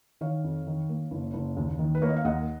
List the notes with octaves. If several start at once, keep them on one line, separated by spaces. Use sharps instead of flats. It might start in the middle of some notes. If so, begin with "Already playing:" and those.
D#3 C#5 F5
F2
D#3
A#3
F#1
F#1
D#2
D#3
B4
A#3 C#5
D#5
F5
D#2 D#5 F#5